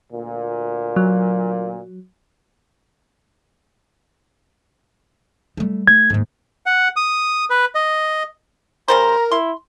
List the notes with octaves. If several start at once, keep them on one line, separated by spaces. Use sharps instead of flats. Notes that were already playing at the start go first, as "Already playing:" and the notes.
D2 A#2
F#3
G3 A3
A3 G#6
D#2 G#2
F#5
D#6
B4
D#5
C#3 G3 A#4 C5 A#5
E4 C6